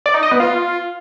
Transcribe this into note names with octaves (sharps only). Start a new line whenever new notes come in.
D5
D#4
D#5
B3
F4